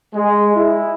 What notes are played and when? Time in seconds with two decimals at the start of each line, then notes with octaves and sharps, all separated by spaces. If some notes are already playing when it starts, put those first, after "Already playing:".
0.14 G#3
0.55 E4